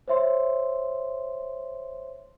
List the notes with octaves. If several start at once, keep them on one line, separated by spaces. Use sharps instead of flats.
C5 C#5 E5 C6